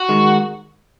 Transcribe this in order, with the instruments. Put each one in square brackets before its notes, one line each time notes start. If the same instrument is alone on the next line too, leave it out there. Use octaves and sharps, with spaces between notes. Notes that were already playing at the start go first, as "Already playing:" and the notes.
Already playing: [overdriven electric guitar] F#4
[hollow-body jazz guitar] D#3 G#3